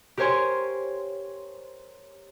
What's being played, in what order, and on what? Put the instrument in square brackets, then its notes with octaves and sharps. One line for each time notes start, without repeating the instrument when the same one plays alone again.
[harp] G4 A#4 C5 C#5 G#5 C6